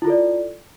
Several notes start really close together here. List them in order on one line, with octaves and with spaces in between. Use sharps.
E4 F4 A4 D5